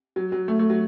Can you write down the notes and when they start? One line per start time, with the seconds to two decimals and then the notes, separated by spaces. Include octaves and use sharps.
0.16 F#3
0.32 F#3
0.48 A3
0.59 A3
0.70 F#3